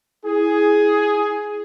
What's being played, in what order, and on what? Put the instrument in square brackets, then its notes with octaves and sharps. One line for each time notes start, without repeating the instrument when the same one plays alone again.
[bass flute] E4 [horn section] G#4